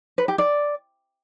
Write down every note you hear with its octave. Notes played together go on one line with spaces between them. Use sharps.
B4
G4
D5